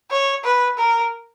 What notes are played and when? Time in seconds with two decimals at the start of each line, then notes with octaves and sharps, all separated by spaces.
0.10 C#5
0.44 B4
0.77 A#4